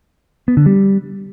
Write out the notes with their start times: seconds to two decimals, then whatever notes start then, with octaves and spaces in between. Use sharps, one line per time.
0.48 B3
0.57 D3
0.66 G3